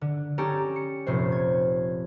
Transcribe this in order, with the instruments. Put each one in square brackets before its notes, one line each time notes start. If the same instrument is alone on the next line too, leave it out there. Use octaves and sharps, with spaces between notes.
[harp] D3
C#4 G4 A4 A5 A#5
C#7
F1 A#2 C5 C#5
G#6